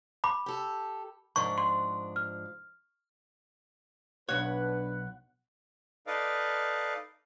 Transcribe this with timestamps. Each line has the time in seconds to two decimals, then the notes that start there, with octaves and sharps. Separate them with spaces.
0.24 B5 D6
0.46 G4 A4
1.36 G#2 F3 D4 C#6
1.58 C6
2.16 F6
4.29 B1 D4 B4 C#5 F#5
6.07 D#4 A4 B4 D5 D#5 F5